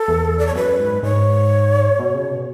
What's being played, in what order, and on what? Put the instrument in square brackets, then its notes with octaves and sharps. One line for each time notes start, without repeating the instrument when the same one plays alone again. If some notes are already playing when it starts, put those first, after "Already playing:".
Already playing: [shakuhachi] A4
[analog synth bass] E2
[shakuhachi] D5
C#5
[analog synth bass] F#2 [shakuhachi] B4
[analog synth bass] G#2
[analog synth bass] G#2 [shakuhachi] C#5
[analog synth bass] B2
C#3
B2